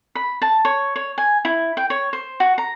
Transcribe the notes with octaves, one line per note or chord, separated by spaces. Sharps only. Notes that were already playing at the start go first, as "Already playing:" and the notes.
B5
A5
C#5
C#5
G#5
E4
G5
C#5
C5
F#4
A#5